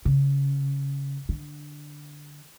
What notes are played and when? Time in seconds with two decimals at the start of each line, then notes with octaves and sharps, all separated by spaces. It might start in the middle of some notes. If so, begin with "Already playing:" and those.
0.05 C#3
1.29 D3